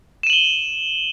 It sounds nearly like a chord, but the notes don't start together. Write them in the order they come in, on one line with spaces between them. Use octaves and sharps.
E7 D#7 F#7 G7